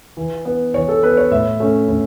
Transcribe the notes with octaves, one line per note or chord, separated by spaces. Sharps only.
E3
B3
E3 C#5
A4
B3 B4
C#5
A2 E5
A3 C#4
A2